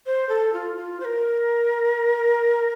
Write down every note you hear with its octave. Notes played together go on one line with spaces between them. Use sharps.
C5
A4
F4
F4
C5
A#4